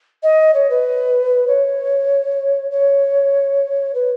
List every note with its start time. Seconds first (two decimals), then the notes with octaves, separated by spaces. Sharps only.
0.23 D#5
0.54 C#5
0.69 B4
1.47 C#5
2.71 C#5
3.94 B4